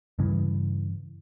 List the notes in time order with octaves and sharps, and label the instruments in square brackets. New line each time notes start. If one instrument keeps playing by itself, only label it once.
[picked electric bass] G2 C#3 E3